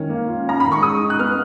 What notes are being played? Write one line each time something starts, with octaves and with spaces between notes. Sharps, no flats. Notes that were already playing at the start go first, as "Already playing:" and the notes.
Already playing: D#3 C#4
A#3
F4
C#4 A#5
D#3 B5
C#6
G#3 D#6
D#4
F#6
B3 F6